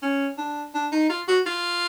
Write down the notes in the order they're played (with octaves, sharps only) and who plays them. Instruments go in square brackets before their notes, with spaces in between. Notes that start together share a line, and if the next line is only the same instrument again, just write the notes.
[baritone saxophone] C#4
D4
D4
D#4
F4
F#4
F4